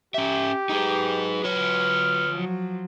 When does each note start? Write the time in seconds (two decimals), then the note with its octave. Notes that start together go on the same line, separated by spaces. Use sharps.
0.14 C#4 G4 E5
0.69 F#3 D#4 G#4 B4
1.44 F4 C#5 F6
2.30 F3 F#3